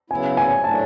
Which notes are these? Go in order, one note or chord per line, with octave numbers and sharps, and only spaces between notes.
C#3 F#3 B3 E4 G#5
G#5
A2 F#3 A3 D4 A5